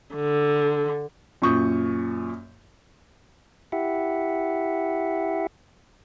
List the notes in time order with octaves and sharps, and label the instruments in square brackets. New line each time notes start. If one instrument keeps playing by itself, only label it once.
[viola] D3
[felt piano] F#2 A#2 C#6 D#6 G6
[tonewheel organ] E4 G4 E5 F#5